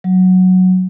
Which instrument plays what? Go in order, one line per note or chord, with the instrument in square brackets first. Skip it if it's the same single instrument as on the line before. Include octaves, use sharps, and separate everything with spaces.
[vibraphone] F#3